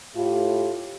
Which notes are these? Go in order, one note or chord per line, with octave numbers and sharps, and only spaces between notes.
A2 F4 G4